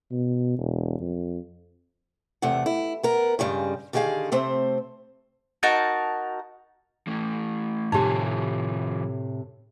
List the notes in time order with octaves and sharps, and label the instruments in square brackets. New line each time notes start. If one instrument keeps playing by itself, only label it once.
[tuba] B2
E1
F2
[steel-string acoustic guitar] E2 C3 A3 F#5
E4
B3 A#4
G2 C#3 G3 G#3
D3 D#3 G4 G#4 F5
C3 A3 C4 C5
[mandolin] D#4 F#4 A#4 A5
[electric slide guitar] E3 A3
[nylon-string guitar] A2 C3 A3 [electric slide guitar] D#3 F3 G#5 [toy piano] D#4 G4